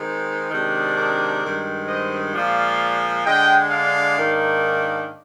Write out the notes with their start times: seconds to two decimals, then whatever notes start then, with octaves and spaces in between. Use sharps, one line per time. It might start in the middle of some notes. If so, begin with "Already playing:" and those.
Already playing: D#3 G#3 C4
0.51 C3 D#3 G#3 D4
0.96 A#4 D5
1.42 G2 D#3 G#3
1.87 C5 D#5
2.33 A#2 F3 G#3 D5 F5
3.25 D3 G#3 D4 D#5 G5
3.71 D5 F5
4.16 G#2 D#3 A#3 D4